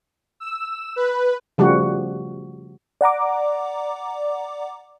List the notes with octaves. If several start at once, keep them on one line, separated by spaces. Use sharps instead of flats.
E6
B4
C#3 F3 G3 A3 F#4
D5 F#5 A#5 D6